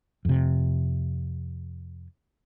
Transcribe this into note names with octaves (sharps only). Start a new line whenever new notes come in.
F2 C3